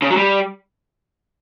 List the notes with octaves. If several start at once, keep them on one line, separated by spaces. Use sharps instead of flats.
C#3
F#3
G3